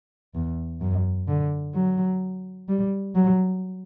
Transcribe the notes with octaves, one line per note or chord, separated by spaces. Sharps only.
E2
F#2
D3
F#3
G3
F#3